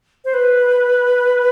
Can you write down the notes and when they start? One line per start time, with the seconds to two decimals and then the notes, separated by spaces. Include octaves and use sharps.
0.25 C5
0.34 B4